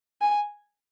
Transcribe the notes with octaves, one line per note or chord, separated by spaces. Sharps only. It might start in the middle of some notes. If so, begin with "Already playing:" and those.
G#5